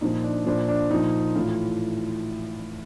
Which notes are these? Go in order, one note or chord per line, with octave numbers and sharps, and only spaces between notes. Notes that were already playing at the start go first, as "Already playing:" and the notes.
A#2 F3 D#4
D4
A#2 F3 D4
D4
A#2 F3 D#4
A2 E3 F4